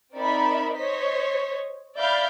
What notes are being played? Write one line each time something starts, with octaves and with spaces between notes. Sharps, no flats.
C4 D#4 A#4 D5 E5 B5
C5 C#5 D#5 B6
D5 E5 F5 B5 F6 G6